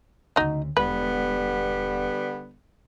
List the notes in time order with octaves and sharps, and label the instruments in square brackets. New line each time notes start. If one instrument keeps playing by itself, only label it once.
[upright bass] D2 C#3 [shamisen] F#3 D#4
[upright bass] E1 [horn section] D3 G3 B3 [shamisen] B4